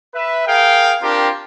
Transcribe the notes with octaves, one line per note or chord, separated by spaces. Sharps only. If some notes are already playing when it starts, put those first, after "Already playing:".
B4 E5
G#4 A#4 F5 G5
C4 D4 F4 G4 A#4